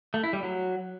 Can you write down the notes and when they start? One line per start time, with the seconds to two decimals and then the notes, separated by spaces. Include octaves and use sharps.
0.14 A3
0.24 E4
0.33 G3
0.43 F#3